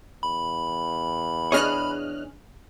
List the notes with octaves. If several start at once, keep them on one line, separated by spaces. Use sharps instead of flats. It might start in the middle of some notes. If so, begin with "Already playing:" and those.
E2 B5
D4 G#4 C#5 D#5 F6 F#6